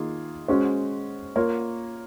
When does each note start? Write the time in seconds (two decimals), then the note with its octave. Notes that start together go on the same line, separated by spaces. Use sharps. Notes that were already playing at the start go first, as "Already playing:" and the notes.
Already playing: D#3 A#3 F4 G#4
0.48 G#3 C#4 F#4 C5
1.36 A#3 F4 A#4 C#5